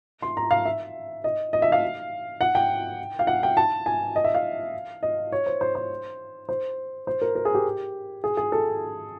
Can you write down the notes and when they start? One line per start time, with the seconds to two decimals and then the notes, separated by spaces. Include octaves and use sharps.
0.22 C6
0.37 A#5
0.51 F5
0.65 E5
1.24 D#5
1.53 D#5
1.62 E5
1.72 F5
2.41 F#5
2.55 G5
3.19 F5
3.27 F#5
3.43 G5
3.57 A5
3.86 G#5
4.16 D#5
4.24 E5
4.35 F5
5.03 D#5
5.32 C#5
5.46 C5
5.61 C5
5.75 C5
6.49 C5
7.07 C5
7.22 A#4
7.35 A#4
7.45 G#4
7.55 G4
8.24 G#4
8.37 G#4
8.52 A4